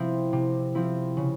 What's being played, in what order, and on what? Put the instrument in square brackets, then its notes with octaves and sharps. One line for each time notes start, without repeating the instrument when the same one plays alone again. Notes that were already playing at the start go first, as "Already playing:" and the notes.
Already playing: [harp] C3 F3 C4 E4
C3
F3 C4 E4
C#3